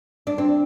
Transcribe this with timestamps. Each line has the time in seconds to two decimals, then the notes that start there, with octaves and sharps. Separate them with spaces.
0.27 D4
0.38 C4